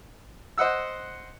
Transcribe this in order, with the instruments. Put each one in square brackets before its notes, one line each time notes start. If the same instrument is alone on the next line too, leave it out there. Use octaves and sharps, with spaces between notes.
[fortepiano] C5 D#5 F#5 E6